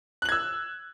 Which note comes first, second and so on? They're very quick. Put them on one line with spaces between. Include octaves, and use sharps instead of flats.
F#6 F#7 G#6 E6